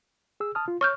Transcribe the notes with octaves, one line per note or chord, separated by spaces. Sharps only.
G#4 E6
A5 D#6 F6
F4
C#5 C#6 F6 G6